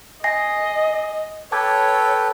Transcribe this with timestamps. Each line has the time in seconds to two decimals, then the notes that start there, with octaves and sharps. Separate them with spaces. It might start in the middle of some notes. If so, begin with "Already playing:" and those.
0.24 D#5 G#5 A#6 C7
1.52 A4 B4 C#5 G5 A5 D6 G#6